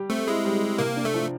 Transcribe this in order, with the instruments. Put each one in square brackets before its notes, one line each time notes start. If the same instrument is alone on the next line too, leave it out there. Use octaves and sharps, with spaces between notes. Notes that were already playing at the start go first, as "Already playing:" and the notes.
Already playing: [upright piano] G3 G4
[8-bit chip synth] A3 [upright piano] C4
[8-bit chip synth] G#3 [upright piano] E4
[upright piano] G3
G4
[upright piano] C3 [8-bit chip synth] A#3
[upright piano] D4
[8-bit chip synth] A3
[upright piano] F3